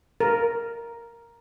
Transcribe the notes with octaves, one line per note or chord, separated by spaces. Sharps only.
A#4